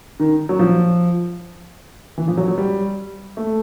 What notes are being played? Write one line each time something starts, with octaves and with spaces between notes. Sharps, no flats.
D#3
F#3
F3
E3
F3
F#3
F#3
G3
A3